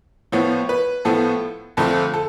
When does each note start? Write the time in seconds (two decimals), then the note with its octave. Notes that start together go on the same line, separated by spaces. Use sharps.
0.32 A2 F3 B3 C#5
0.69 B4
1.05 A2 F3 B3 A4
1.77 F2 D3 F3 A3 A4
2.14 A4